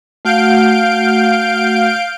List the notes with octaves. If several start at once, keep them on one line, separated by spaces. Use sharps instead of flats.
A3 F#4 F5 F#5 G6 D7